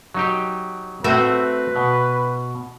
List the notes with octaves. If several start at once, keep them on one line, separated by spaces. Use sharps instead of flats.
F#3 D#4 G4
A3 C4 F#4 B4 E5
B2